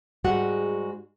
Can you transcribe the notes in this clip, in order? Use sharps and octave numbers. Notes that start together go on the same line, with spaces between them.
G#2 G3 G#3 F#4 F#5